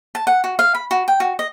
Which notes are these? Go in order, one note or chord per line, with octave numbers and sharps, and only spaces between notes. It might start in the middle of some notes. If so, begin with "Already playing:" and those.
A5
F#5
F#4
F5
B5
F#4
G5
F#4
D#5